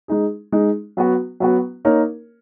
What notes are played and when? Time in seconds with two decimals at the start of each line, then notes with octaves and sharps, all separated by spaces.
0.08 G#3 D#4 G#4
0.52 G#3 D#4 G#4
0.97 F#3 B3 F#4
1.40 F#3 B3 F#4
1.85 A#3 D#4 A#4 C#5